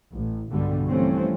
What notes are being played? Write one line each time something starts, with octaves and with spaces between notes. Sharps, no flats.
A1
B1 G2 B2 D3 G3
E3 F3 G3 A3 C4 C#4